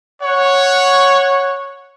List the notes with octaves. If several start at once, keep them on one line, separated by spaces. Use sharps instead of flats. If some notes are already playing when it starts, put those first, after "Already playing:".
C#5 F#5